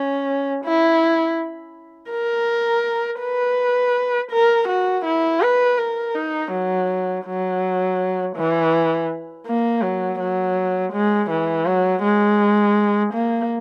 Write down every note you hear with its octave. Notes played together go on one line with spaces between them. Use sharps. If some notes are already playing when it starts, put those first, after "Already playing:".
Already playing: C#4
E4
A#4
B4
A#4
F#4
E4
B4
A#4
D#4
F#3
F#3
E3
A#3
F#3
F#3
G#3
E3
F#3
G#3
A#3